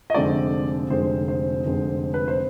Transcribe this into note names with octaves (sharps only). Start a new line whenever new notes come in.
D#5
F1 F2 D3 G#3 C4 D5
F1 F2 D3 G#3 C4 C5
C5
F1 F2 D3 G#3 C4
B4
C5